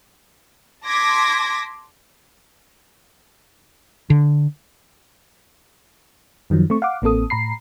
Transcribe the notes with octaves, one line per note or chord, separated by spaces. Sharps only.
A5 C6 D6 G#6 A#6 B6
D3
F#2 D#3 F3 F#3
A3 C4 C#6
F5 F#5 D6
A1 A#3 C4 A4 D#6
A2 A#5 B5 C7